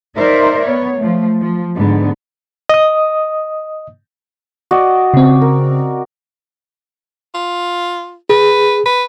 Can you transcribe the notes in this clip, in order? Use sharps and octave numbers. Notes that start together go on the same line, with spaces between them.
D#4 A#4 C5 D5 E5
B3 C#5
F3 A3
F3
G#2 D3 B3
D#5 D#6
F#4 D5 D#5
C#3 C4
A#4
F4
G#4 B4
B4